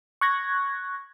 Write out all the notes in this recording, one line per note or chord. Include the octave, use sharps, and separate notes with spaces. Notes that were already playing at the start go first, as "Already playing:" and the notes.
C#6 F#6 G#6 A#6